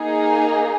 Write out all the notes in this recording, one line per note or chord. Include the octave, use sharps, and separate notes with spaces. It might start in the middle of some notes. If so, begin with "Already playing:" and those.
Already playing: A#3 D#4 G#4